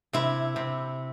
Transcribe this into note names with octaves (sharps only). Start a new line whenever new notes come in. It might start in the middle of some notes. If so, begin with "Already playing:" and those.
C3 E4
C3